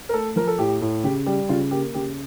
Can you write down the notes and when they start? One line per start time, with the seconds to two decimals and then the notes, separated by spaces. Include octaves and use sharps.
0.09 A#4
0.13 A3 A4
0.36 F3 A#4
0.47 A4
0.59 A2 G4
0.81 A2
1.04 C#3 G4
1.26 G3 G4
1.49 C#3 F4
1.71 A#3 G4
1.94 C#3 G4